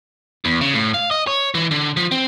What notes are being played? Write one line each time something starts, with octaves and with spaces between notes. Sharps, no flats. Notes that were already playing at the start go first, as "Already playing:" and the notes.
E2
C#3
A2
F5
D#5
C#5
E3
D3
F3
C4